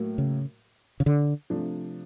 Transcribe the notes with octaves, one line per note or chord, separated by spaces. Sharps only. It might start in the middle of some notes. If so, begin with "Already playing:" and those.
Already playing: A2 F#3 A#3
C#3
C#3
D3
C3 F3 A3 D4